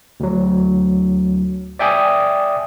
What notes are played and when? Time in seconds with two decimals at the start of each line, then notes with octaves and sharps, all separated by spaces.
0.20 D2 F#3
1.79 D5 E5 G5 G#5 D6 D#6